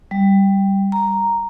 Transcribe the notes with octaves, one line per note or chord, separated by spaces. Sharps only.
G3
A#5